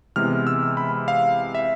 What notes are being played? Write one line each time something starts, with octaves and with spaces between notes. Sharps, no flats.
C3 E3 G#3 B3 F6
E6
B5
F5
E5